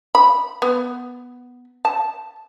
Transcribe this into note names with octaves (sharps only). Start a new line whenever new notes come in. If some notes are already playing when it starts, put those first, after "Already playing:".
B5
B3
A5